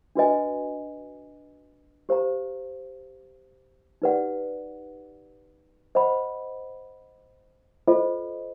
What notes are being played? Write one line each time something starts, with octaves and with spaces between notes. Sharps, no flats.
D4 F#4 B4 D#5 G#5
G4 C5 F5 A#5
D#4 G4 B4 D5 F#5
C5 D#5 F#5 B5
F4 A4 C5 D#5